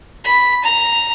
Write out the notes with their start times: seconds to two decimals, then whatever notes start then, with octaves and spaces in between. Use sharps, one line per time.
0.24 B5
0.63 A#5